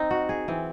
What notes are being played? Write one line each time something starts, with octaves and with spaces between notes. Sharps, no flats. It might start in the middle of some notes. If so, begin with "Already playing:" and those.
Already playing: C4 D#4
F#4
G#4
E3 C4